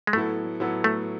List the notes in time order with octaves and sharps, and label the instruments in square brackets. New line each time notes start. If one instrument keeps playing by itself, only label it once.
[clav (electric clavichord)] G#3
[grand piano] A2 F#3 B3 E4 A4 [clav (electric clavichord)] A3
[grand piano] A2 F#3 B3 E4 A4
[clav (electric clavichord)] A3